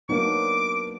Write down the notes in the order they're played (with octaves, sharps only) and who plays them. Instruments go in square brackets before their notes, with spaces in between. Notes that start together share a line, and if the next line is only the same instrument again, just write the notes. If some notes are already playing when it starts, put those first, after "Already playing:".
[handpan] F#3 B3 D4 [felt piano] A#3 D#4 [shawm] D6